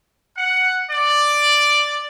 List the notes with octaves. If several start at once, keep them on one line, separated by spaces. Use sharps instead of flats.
F#5
D5